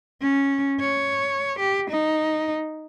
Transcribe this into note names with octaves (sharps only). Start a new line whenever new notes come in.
C#4
C#5
G4
D#4